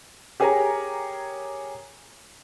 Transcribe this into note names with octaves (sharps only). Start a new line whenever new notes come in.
G4 G#4 A#4 C#5 G#5 A#5